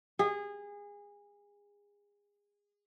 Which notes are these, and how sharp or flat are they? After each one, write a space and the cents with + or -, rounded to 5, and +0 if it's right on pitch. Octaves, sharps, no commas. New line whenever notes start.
G#4 -25